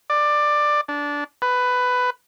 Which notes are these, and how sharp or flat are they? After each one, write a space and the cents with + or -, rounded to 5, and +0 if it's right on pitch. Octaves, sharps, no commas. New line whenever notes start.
D5 +15
D4 -15
B4 +10